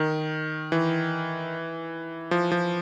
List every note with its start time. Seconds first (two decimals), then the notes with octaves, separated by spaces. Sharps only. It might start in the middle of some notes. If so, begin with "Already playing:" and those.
Already playing: D#3
0.72 E3
2.31 F3
2.52 F3